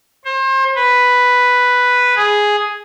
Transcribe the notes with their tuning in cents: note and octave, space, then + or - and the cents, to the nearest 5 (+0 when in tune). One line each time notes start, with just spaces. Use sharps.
C5 +35
B4 +0
G#4 +0